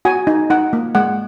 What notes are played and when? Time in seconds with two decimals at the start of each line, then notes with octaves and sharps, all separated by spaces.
0.05 F#4 G#5
0.27 D#4
0.50 D#4 F#5
0.73 A#3
0.95 G#3 F#5